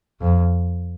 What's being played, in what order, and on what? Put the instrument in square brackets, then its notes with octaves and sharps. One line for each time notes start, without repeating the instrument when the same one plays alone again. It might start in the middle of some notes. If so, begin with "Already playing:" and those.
[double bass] F2